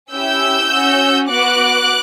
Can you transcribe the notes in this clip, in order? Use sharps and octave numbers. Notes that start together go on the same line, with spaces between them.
C#4 E4 G4 E6 G6
C#4 F#4
B3 F#4 D6 F#6